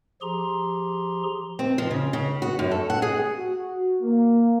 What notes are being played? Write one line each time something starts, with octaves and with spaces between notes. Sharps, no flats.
F3 G4 G#4 A#5 C6
C4
F3
C#3
C#3
F#4
F#2
A4
F#5
G#4
F#4
A#3